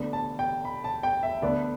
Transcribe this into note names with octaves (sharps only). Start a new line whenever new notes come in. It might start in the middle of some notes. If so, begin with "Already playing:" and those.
Already playing: D2 D3 B3 D4
A5
G5
B5
A5
G5
E5
D2 D3 B3 D4 D5